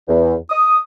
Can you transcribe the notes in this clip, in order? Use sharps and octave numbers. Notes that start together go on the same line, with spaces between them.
E2
D#6